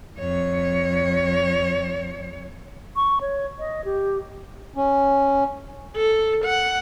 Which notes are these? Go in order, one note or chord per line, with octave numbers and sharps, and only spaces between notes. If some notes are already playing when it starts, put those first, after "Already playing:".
F2 C#5
C#6
C#5
D#5
G4
C#4
A4
F#5